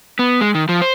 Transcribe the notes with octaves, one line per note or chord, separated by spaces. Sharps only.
B3
G#3
D#3
F3
C5